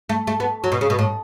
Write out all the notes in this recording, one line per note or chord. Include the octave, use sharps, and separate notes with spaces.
A3
A3
B3
F#3
B2
C#3
B2
A2